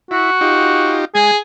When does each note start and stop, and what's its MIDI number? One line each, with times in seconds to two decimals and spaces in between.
0.11 0.31 64
0.11 1.00 66
0.41 1.05 63
0.41 1.05 65
0.41 1.05 67
1.15 1.31 56
1.15 1.37 68
1.15 1.31 80